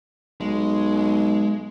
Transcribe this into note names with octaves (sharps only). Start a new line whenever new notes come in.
B1 G#3